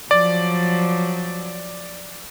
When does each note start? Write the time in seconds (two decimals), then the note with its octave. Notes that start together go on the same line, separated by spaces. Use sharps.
0.11 F3 F#3 D5